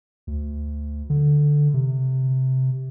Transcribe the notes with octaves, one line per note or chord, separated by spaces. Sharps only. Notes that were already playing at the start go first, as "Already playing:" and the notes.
D2
D3
C3